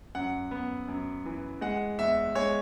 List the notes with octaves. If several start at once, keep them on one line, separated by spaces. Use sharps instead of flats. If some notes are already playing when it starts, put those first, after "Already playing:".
F#2 F#5
B3
F#2
E3
G#3 F#5
E2 E5
G#3 C#5